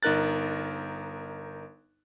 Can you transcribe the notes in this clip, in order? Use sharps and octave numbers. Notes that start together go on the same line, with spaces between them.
G1 D#4 A#4 F#6 A6